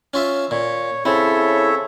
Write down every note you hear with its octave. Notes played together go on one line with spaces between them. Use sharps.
C#4 F4 E5
A#2 C#5
C#3 C4 E4 A4 C#5 E5